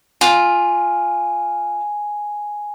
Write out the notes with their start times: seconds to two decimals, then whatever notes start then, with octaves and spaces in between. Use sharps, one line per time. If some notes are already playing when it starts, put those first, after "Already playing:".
0.21 F4 G#5